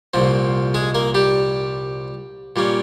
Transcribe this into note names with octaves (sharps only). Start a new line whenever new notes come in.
C2 A#2 F3 C4
G#3 G#4
A#3 A#4
G3 G4
A#2 G3 A#3 C#4